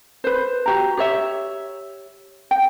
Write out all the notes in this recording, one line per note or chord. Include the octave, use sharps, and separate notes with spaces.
B4 C5
F#4 G4 A#5
G4 C#5 E5
G5